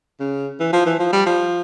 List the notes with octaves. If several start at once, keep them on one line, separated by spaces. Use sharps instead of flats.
C#3
E3
F3
E3
F3
G3
F3